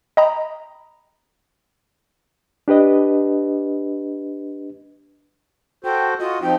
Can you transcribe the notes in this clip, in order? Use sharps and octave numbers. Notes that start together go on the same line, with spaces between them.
D#5 G5 A#5 B5 D#6
D4 G4 B4 D#5
F#4 A4 C5 G5
F4 F#4 D#5
F3 C4 D#4 G5